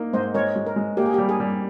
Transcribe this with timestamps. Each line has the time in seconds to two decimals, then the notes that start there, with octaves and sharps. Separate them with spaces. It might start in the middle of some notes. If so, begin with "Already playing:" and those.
Already playing: A#3 D#4
0.13 G#2 C5 D#5
0.34 G#3 A#4 C#5
0.56 G#3
0.66 A#4
0.76 G#3
0.97 A#3 G4
1.06 G#4
1.14 G3 G4
1.29 G#4
1.40 G3